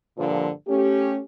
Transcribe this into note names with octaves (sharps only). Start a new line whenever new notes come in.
G2 A#2 D3 F3
A3 C#4 G4